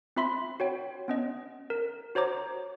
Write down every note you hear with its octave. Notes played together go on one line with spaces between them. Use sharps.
C4 F4 E5 B5 C6 B6
F#4 C#5 G5
B3 C#4 D#5
A#4
F#4 C5 C#5 A#5 D6